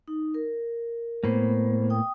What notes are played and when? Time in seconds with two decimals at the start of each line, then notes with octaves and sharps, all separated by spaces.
0.08 D#4
0.34 A#4
1.24 A2 A#3 B3 B4 C5
1.90 G5 D#6